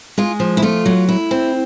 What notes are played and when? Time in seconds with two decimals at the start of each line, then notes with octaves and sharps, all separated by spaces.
0.18 G#3 F4
0.40 F3
0.57 E4
0.62 A3 F4
0.86 F#3
1.09 E4
1.31 C4